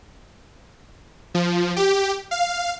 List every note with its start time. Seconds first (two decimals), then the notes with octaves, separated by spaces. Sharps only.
1.34 F3
1.76 G4
2.31 F5